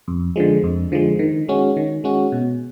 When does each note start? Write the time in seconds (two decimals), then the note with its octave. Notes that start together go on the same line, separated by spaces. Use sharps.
0.08 F2
0.36 D3 F3 G#3
0.64 F2
0.92 D3 F3 G#3
1.19 D#3
1.49 G#3 C#4 F#4
1.77 D#3
2.04 G#3 C#4 F#4
2.32 B2